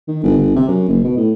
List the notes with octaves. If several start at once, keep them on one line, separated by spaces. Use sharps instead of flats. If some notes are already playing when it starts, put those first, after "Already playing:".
D#3
G1
G1
C3
F#2
F#1
B2
A2